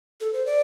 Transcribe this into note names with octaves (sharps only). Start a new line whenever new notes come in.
A4
C5
D5